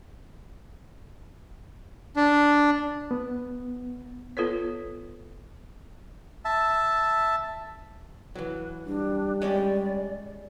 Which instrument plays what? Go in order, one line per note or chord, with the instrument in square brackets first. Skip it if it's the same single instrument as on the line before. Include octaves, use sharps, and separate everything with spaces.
[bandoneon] D4
[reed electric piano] B3
[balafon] B3 F4 A4 B4 C#5
[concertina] E5 A5
[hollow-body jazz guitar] E3 F#3 [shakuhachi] B4
[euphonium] G3 [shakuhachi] D4
[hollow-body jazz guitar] G#3 C#4 G4 [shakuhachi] D5